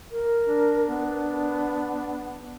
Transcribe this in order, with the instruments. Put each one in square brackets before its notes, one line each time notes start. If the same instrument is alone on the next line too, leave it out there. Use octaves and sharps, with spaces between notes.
[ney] A#4
[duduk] D4
[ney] B3